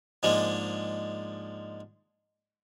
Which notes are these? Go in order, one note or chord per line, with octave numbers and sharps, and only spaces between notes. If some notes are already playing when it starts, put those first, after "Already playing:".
G#2 F3 G#3 A#3 D4